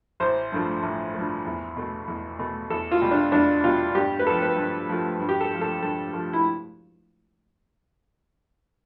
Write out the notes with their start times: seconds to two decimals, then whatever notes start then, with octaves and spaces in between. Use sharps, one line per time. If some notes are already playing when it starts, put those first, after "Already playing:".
0.20 A1 C5
0.52 G2 F3 A3
0.83 A1
1.13 G2 F3 A3
1.45 E2
1.76 B2 A3
2.08 E2
2.39 B2 A3
2.70 E2 A4
2.91 F4
3.02 B2 G3
3.11 D4
3.32 E2 D4
3.64 B2 G3 F4
3.95 G2 G4
4.19 B4
4.26 F3 A3 A4
4.42 B4
4.57 G2
4.89 F3 A3
5.19 G2
5.29 G4
5.41 A4
5.51 F3 A3
5.61 A4
5.83 G2 A4
6.13 F3 A3
6.33 E4